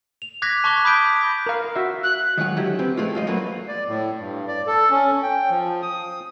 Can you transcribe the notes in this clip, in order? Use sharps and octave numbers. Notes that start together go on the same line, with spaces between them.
F7
D6 F#6 G#6 A#6 B6
A5 C#6 D6 F#6 G7
B5 D6 D#6 G6 B6 D7
A#4 F5
F#4 E5
F#6
D#3 F#3 G#3 F4 F#5
D3 F#3 E4 G4
C4 G4 B4
F3 G#3 A3 F4
G2 F4 D#5
F#3 A3 A#3 F4 F#4 B4
D5
A2
G2
D5
A4
C#4
G5
F3
D#6